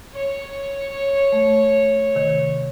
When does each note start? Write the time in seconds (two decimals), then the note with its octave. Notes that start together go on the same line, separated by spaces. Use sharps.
0.13 C#5
1.32 A3
2.15 C3 D#3